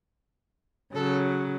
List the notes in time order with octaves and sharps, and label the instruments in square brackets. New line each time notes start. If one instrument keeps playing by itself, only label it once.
[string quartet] C#3 F#3 A4